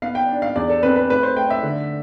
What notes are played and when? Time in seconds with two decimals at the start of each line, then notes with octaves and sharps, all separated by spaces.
0.02 B3 F5
0.15 G5
0.28 D4
0.42 F5
0.56 E2 D5
0.69 A4
0.83 C4 B4
0.96 B4
1.09 A3 B4
1.23 C5
1.37 A3 G5
1.50 E5
1.63 D3